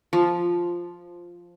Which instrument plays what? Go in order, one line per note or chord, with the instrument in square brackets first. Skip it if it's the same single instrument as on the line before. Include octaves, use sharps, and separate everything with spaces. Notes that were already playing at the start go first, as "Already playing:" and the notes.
[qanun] F3